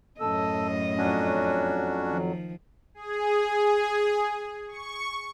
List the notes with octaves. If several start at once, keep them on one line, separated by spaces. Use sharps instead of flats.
F#2 A2 A4 D#5 E6
F2 F#3 C#4 D4 F#4
D#3 F3
G#4
C#6